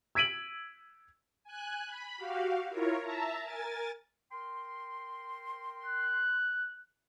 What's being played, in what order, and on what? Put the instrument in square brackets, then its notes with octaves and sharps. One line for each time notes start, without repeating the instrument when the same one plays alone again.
[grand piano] E6 G#6 B6 D7 D#7 F#7
[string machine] G#5 F#6
B5
F#4 G4 F5
E4 F4 A#4 C#5
E5 A5 A#5
A#4 G#5 A6
[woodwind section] A#4 G5 C6
[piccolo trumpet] F#6